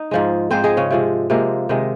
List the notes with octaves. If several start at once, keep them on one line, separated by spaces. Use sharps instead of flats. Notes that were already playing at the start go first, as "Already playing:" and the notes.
Already playing: D#4 D#5
G#2 F3 G#3
G#2 F3 G#3 C4 C5
G#3 G#4
C#3 C#4
C3 F3 G#3
C3 F3 G#3 A#3
C3 D#3 G#3